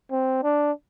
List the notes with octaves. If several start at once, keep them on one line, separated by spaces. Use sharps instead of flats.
C4
D4